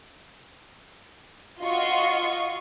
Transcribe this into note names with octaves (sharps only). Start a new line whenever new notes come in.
F4 F#4 D#5 C#6